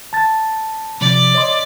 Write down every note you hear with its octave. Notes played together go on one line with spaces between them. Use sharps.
A5 A6
C3 F3 D5
C#5 D#5 C6